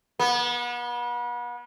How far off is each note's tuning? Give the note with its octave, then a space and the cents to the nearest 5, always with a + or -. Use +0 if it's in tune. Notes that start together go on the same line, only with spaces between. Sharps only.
B3 -35